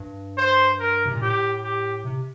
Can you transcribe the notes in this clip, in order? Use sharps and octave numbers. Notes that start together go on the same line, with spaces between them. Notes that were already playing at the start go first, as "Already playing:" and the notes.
Already playing: G2
C5
A#4
C3
A#2
A2 G4
G4
C3